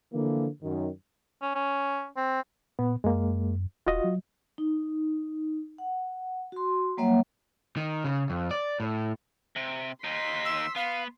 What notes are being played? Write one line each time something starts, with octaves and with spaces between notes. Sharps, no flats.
D3 E3 F3 A#3
F#2 D#3
C#4
C#4
C4
A#2 B3
F#2 G#3 A#3
D#1 F4 F#4 D#5
F#3
D#4
F#5
F#4 C6
F#3 G3 A#3 C#5 E5 F#5
D#3
C#3
F2
D5
A2
C3
D#2 D#4 C6 B6
E6
B3 F5